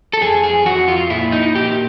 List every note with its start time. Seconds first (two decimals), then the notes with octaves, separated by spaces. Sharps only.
0.13 A4
0.21 F2 G#4
0.44 G#4
0.66 F2 F#4
0.88 F4
1.10 A#2 E4
1.32 D#4
1.55 A#2 G4